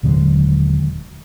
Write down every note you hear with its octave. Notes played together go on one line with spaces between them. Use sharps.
D#1 D3 F#3 G#3